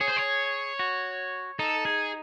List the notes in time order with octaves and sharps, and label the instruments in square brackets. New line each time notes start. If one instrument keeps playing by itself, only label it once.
[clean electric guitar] G#4 [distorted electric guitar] C#5
[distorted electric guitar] C5
C#5
[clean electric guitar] F#4
[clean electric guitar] D#4 [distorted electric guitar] A4
[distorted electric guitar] G#4